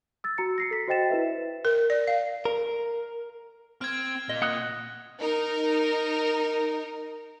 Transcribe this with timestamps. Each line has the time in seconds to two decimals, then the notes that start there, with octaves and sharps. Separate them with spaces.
0.24 E6 A6
0.38 F#4 A#5 C#7
0.58 A#6 C7 C#7
0.71 A4 B6
0.88 F#4 C5 D#5 G5 A6 E7
1.10 E4 B4 E5
1.65 A#4
1.90 D5
2.07 F5
2.45 A#4
3.81 C4 F6 G#6
4.29 A#2 D#5
4.42 A#2 F#5 D#6 F#6
5.20 D#4 A#4